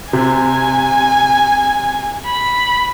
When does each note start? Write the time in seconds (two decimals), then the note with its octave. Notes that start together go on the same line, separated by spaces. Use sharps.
0.13 C3 G#5
2.25 B5